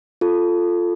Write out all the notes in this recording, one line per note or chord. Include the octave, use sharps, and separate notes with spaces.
F4 A4